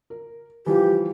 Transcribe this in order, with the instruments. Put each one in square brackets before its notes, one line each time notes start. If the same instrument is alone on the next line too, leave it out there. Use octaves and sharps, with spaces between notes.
[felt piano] A#4
[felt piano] E3 F3 G3 [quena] G4